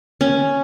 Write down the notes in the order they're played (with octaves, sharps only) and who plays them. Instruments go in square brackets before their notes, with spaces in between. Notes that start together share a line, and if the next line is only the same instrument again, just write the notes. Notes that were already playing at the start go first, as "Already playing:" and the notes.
[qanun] C#4